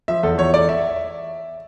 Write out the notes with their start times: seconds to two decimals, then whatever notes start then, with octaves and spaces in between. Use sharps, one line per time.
0.08 F3 E5
0.23 E2 A4
0.38 E2 C#5
0.54 E2 D5
0.69 E5